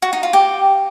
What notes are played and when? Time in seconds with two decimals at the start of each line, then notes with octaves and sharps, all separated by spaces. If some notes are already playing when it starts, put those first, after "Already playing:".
0.02 F#4
0.13 D#4
0.23 F4
0.33 G4